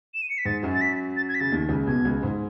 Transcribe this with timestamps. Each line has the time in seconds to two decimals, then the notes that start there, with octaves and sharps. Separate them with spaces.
0.14 E7
0.22 D#7
0.30 C#7
0.38 B6
0.45 G#2 A6
0.63 F#2 F#3
0.74 A6
0.81 B6
1.17 A6
1.29 G#6
1.35 B6
1.40 C#3 A6
1.51 D#2 D#3
1.69 C#2 C#3
1.87 B1 B2 G#6
2.05 C#2 C#3
2.23 G#2